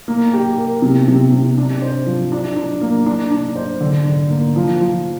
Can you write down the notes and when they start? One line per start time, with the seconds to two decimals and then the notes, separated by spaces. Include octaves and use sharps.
0.08 A#3
0.33 G4
0.58 A#4
0.82 C3
1.08 C3
1.32 C3
1.58 D4
1.82 C5
2.06 F3
2.32 D4
2.56 D4
2.81 A#3
3.06 D4
3.31 D4
3.56 C5
3.81 D3
4.06 D3
4.30 A#3
4.56 F3
4.81 F3